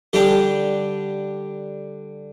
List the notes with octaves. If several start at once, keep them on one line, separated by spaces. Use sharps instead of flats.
D3 G3 D4 G4